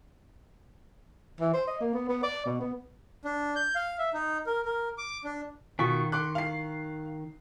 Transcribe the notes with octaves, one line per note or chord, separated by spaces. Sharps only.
E3
C5
D#5
A#3
B3
B3
D5
B2
B3
D4
G6
F5
E5
D#4
A#4
A#4
D6
D4
B2 D#3 F4 C#6 B6
C6 D6 F#6
F5 C7